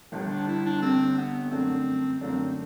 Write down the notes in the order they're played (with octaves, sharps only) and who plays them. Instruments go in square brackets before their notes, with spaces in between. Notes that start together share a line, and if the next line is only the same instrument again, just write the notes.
[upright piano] G1 G2 D3 [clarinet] D4
[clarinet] D4
E4
D4
[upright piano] G1 G2 D3 [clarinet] C4
[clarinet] B3
[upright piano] F#2 D3 A3 D4 [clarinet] C4
[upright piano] F#2 D3 A3 D4 [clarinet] C4